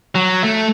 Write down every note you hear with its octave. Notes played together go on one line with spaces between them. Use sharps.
F#3
A3